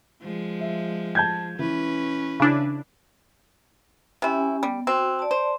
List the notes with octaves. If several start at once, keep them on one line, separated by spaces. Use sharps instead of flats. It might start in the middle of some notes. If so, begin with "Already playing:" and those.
F3 G#3
E5
A5 G6 G#6
E3 C#4 B4
C#3 D4 E4
C3 C#4 E4 G4 G#5
G3 B3
C4 F#4
D5 A5
C5